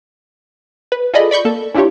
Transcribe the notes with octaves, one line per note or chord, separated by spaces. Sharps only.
B4
F4 G#4 A4 D5 D#5 B5
D5 B5 C#6 G6
A#3 A4
C#4 D4 E4 F4 G4 C#5